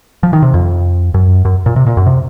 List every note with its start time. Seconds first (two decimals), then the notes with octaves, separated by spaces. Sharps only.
0.23 F3
0.33 D#3
0.42 C3
0.54 F2
1.14 F#2
1.45 F#2
1.66 A#2
1.76 C3
1.87 A#2
1.97 F#2
2.06 C3